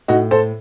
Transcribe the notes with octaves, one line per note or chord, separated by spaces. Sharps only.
A2 D#4 F#4
A4 C5